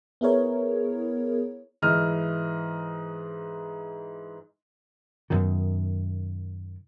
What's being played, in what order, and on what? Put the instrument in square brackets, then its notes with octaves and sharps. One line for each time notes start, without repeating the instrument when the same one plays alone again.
[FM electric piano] B3 E4 G#4 A#4 C#5
[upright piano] G#2 E3 D#5 F6
[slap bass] F#2 B2 D#3